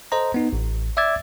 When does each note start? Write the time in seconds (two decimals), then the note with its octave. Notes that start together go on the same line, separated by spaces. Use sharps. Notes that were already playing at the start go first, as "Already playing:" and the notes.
0.12 A4 C5 D#5 A#5
0.34 B3 D#4
0.53 A1
0.97 D5 E5 D6 E6 G#6 A6